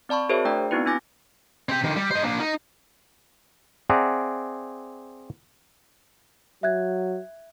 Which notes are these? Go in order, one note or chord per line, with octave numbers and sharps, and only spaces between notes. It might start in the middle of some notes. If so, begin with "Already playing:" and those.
C4 D5 A5 B5 C#6
F#4 G#4 A#4 C5 C#5 E5
A3 D4 D5 G5 A#5
B3 C4 D#4 E4 F#4 B4
D4 E4 G#5 D6 A#6
C4 G4
D3 D#3
G3
C5 D#5
A#3 D4
D#4
C4 G#4 D5 E5 F#5 A#5
F#3 E5 F#6 G#6